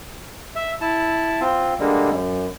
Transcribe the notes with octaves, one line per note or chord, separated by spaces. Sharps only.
E5
E4 A5
C4 F4
D3 G3 G#3 A#3
F#2